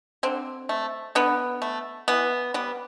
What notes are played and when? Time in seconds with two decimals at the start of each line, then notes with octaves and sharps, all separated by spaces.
0.23 D3 C4
0.69 A3
1.15 D3 B3
1.62 A3
2.08 E3 B3
2.54 G3 B3